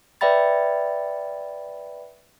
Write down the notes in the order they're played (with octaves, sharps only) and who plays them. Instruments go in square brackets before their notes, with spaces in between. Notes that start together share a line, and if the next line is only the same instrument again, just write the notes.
[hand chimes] B4 D5 E5 G5 B5 A6